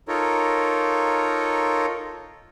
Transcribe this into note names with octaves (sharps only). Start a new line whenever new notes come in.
D#4 F4 A4 A#4 C#5